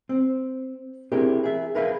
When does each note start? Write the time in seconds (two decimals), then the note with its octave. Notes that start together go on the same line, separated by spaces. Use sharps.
0.09 C4
1.12 C4 D4 E4 G4 G#4 A#4
1.44 G#4 E5
1.75 G#4 A#4 B4 D5 E5 F5